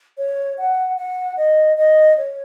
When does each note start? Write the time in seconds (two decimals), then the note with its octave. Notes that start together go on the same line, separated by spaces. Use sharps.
0.18 C#5
0.58 F#5
0.97 F#5
1.37 D#5
1.78 D#5
2.18 C#5